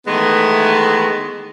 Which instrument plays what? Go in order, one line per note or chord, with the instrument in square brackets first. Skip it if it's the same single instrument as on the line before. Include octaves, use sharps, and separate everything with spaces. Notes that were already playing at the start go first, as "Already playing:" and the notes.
[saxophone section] D#3 E3 G#3 A3 B3